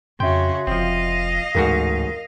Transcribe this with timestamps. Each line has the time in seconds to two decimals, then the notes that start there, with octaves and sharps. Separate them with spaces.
0.20 F2 C#3 F#4 E5 G5 C6
0.67 F1 F3 C4 D#5 F5
1.55 A1 D2 G#2 F#4 A#4